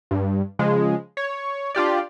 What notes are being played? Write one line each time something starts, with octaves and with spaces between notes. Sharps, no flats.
G2
C#3 F3 G#3
C#5
D4 F4 G4 D5